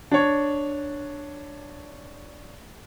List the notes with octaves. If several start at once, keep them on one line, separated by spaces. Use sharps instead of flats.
D4 C#5